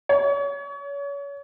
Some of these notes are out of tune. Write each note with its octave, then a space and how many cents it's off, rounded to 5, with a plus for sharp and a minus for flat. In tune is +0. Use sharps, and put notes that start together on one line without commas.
C#5 +30